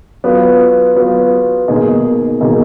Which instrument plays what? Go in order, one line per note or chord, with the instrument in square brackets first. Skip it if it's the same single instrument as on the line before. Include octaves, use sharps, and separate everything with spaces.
[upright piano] F#3 B3 F4
F#3 B3 F4
B2 A#3 D#4 G#4 D#5
B2 A#3 D#4 G#4 D#5